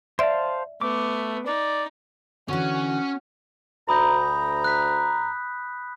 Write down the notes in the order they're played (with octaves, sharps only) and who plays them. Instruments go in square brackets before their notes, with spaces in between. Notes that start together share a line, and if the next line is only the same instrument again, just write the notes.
[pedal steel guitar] C5 F5 A5 [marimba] D5 E5
[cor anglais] A3 [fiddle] B3 [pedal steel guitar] D6
[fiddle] D#4 [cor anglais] D5
[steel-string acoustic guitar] D3 E3 [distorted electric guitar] C#4 C#5 [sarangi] F#4
[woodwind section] D2 A#5 [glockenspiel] B5 D#6 G6
[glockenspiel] F#6 B6